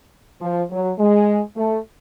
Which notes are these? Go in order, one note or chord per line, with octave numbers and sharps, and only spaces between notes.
F3
F#3
G#3
A3